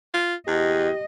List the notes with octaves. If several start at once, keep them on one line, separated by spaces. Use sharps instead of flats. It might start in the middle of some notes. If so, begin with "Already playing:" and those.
F4
E2 G4 D#5